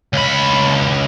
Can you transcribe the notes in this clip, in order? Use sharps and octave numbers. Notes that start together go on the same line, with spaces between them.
C#2 B5